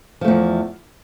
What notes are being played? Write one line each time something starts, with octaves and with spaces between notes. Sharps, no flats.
E2 F3 A3